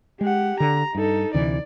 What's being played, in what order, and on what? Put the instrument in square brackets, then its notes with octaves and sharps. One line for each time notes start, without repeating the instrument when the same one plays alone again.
[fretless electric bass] G#3 [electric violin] G4 F#5
[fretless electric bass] D3 [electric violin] A#5
[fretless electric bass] G2 [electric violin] D#4 A4
[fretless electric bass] D2 C3 E3 [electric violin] D5